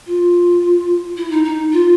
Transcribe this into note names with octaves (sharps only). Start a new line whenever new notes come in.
F4
E4
D#4
D#4
F4